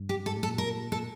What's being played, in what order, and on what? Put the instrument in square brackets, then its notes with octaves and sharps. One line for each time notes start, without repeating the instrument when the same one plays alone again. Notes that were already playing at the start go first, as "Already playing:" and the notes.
Already playing: [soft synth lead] G2
[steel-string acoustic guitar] G4
[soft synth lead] G#2 [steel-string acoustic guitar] A4
[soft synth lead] A2
[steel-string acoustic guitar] A4
[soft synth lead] A#2
[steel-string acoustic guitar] A#4
[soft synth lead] A#2 [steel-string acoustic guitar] A4